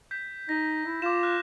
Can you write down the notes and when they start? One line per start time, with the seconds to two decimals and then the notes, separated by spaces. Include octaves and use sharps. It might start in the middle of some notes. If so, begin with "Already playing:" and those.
0.11 G6 B6
0.49 D#4 A#6
0.85 E4
1.02 F4 D6 E7
1.23 F6 F#6